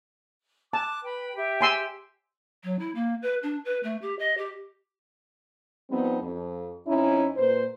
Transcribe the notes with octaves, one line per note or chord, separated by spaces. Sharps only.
A5 D6 F#6
B4 G5 B5
G4 E5 G5
G#5 C6 E6
F#3
E4
A#3
B4
D4
B4
A3
G4
D#5
G4
F3 G3 B3 C4 D#4
F2
F2 C#4 D#4 E4
A#2 B4 C5